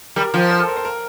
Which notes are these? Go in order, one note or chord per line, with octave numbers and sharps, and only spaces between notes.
G3 A#4
F3 C5
C5
A4
A#4
C5
A#4